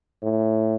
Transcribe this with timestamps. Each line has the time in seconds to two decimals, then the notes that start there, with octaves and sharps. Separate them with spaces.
0.22 A2